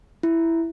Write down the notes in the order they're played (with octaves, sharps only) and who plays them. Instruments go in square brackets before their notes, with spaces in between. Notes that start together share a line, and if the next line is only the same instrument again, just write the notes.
[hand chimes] E4